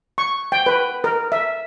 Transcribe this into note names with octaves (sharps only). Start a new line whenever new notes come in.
C#6
G5
B4
A#4
E5